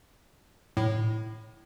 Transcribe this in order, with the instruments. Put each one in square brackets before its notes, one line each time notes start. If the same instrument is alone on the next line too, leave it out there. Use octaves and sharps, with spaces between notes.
[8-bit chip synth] A2